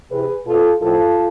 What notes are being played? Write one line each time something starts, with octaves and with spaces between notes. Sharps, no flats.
C3 E3 G#4 B4
B2 F4 A4
A2 F3 F4 A4